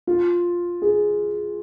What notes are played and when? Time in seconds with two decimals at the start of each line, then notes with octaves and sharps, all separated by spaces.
0.07 F4
0.82 G#4